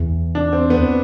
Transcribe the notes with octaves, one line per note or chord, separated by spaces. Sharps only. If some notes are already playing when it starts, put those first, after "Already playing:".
Already playing: E2
D4
C4
B3